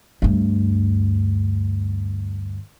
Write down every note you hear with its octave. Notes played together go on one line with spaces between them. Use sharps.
D2 G2